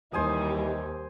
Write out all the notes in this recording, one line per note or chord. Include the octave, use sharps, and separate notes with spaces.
D#2 E3 G3 D#4 C5 G#5 D#6